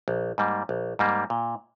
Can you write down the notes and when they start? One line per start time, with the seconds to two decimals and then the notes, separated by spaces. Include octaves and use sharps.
0.08 A#1
0.38 G#2 G3 A#3
0.69 A#1
0.99 G#2 G3 A#3
1.30 A#2